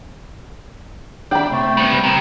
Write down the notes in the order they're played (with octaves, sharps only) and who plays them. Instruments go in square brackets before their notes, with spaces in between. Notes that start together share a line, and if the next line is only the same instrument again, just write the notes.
[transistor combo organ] D4 [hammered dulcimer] G5 B5
[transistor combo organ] C3 [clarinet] A3
[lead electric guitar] G3 B3
G4 A#4